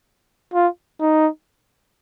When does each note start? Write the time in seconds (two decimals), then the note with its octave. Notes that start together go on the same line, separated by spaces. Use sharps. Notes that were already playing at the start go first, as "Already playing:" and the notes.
0.54 F4
1.00 D#4